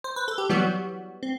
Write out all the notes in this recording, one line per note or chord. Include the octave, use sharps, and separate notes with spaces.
C5
B4
A4
G4
E3 F#3 G3 B3 F#4
C4